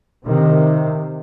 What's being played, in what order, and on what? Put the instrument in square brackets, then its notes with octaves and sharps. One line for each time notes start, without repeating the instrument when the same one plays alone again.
[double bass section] C3 D#3